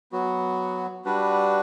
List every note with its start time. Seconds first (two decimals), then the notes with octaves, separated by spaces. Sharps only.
0.12 F#3 B3 F#4
1.05 G3 D4 F#4 B4